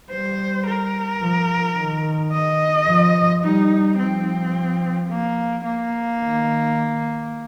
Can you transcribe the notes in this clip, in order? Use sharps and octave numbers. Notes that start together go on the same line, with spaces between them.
G3 C5
A#4
F3
D#3
D#5
F3
G3 D#4
F3 C4
A#3
A#3
D#3